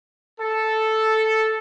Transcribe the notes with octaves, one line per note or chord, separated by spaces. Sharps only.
A4